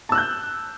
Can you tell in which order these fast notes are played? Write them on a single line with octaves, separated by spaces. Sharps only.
A5 E6 F#6 G6